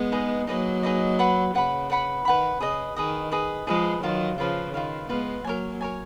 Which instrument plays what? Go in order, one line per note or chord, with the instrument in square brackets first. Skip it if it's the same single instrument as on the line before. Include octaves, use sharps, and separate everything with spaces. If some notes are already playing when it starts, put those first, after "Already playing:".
Already playing: [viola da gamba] G#3 B3
[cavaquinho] D#4 G#4 B4 D#5
[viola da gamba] F#3 A#3 [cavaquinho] D#4 G#4 B4 D#5
[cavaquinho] D#4 G#4 B4 D#5
B4 F#5 B5
[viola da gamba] C#3 [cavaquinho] B4 F#5 B5
[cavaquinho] B4 F#5 B5
[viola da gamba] D#3 [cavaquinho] B4 F#5 B5
[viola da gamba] C#3 [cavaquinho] G#4 B4 D#5
[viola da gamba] D#3 [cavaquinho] G#4 B4 D#5
[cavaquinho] G#4 B4 D#5
[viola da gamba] F3 G#3 [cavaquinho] G#4 B4 D#5
[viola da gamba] D#3 F#3 [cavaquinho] F4 B4 F5
[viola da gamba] C#3 F3 [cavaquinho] F4 B4 F5
[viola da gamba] D#3 [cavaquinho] F4 B4 F5
[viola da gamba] G#3 B3 [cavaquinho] F4 B4 F5
[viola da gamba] F#3 A#3 [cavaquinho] A#4 C#5 G#5
[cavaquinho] A#4 C#5 G#5